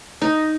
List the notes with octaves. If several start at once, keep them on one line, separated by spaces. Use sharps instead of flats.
D#4